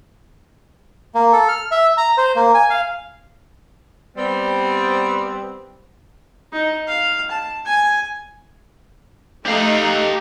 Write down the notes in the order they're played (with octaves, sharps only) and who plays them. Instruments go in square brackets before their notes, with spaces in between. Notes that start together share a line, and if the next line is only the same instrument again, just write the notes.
[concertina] A#3
A4
F6
E5
A#5
C5
A#3
G#5
F5
[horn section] G3 B3 C4
[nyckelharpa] D#4
F5
A5
G#5
[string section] A3 D#4 [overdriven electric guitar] G4 F5